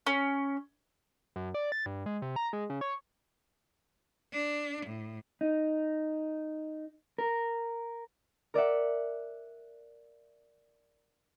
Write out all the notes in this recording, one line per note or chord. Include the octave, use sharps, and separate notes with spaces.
C#4
F#2
D5
A6
G2
G#3
C3
A#5
G#3
C#3
C#5
D4
A2
D#4
A#4
A#4 D5 E5 F#5